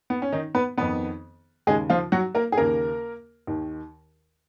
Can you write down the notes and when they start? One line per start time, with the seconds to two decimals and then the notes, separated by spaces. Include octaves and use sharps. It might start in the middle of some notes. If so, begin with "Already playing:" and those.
0.10 B3
0.22 C#4
0.32 D#3 D#4
0.55 B3 B4
0.77 F2 D#3 B3 B4
1.67 D#2 C#3 G#3 G#4
1.90 F3 F4
2.12 F#3 F#4
2.35 A#3 A#4
2.52 G#4
2.57 D#2 C#3 A#3 A#4
3.47 D#2 D#3